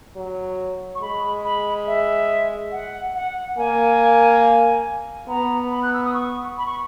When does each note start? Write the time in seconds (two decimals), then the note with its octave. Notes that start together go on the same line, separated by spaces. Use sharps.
0.16 F#3
0.95 C#6
1.01 G#3 B5
1.44 B5
1.87 E5
2.72 F#5
3.15 F#5
3.57 A#3 G#5
5.29 B3 A#5
5.71 B5
5.83 F#6
5.94 E6
6.04 D#6
6.14 C#6
6.58 B5
6.66 C#6